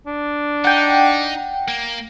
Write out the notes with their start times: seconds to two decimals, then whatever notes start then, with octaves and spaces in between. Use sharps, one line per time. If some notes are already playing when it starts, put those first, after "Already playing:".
0.07 D4
0.65 D#4 F#5 G5
1.68 A#3